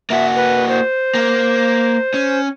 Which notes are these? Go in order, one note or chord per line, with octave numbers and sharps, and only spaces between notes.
A#3 F#4 E5
B4
C5
A#3
C#4